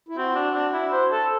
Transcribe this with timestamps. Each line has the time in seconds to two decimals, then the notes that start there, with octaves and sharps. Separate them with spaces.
0.08 E4
0.17 C4 F#4
0.36 D4
0.54 D4
0.73 E4
0.92 C5
1.12 A4